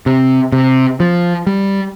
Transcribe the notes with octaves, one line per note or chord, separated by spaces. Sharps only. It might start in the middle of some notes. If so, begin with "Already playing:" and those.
C3
C3
F3
G3